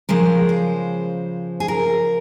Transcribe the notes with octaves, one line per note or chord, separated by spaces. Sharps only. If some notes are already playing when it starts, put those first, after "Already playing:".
C#3 F3 G#3 A#4
C5
G#4
A#4